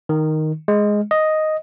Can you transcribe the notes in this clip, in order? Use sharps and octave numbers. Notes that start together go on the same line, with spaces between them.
D#3
G#3
D#5